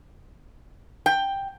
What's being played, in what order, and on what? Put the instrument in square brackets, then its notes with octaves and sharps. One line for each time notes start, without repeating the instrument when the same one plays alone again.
[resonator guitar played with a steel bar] G5